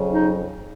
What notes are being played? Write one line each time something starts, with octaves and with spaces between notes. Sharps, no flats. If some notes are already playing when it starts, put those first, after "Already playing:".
Already playing: F2 C#3 F#3
D#4